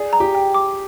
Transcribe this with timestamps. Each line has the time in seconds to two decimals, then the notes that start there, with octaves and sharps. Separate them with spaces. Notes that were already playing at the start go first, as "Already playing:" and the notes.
Already playing: G#4 D5
0.13 A#5
0.20 G4
0.35 G5
0.54 D6